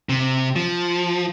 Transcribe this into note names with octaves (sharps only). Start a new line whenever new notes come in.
C3
F3